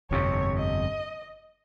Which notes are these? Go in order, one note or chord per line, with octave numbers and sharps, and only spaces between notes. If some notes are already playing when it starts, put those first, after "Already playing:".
G1 F2 C3 C#5
D#5